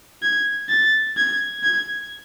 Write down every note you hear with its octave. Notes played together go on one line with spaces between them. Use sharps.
G#6
A6
G#6
G#6